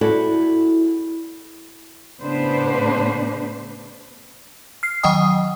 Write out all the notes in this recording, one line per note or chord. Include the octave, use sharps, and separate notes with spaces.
E4 F#4 G#4 A4 C5 D5
A2 C#3 B3 D4 B4 C5
F6 C7
D#3 F#3 D#5 F#5 G5 D#6